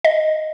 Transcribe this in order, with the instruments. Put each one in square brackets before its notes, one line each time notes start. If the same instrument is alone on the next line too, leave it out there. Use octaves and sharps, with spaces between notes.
[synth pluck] D#5